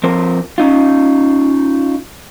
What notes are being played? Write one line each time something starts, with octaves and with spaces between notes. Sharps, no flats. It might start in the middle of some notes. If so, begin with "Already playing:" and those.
F3 C4 A#4 C5
C#4 D#4 F4